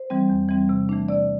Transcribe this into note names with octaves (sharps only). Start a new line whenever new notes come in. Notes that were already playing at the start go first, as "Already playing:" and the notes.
Already playing: C5
E3 G3 C4
E2
E3 G3 C4
C3
E3 A3 D4
C3 D5